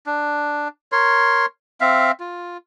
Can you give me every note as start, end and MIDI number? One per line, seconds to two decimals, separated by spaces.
0.06 0.68 62
0.92 1.46 70
0.92 1.46 73
0.92 1.46 84
1.81 2.11 60
1.81 2.11 76
1.81 2.11 77
2.20 2.57 65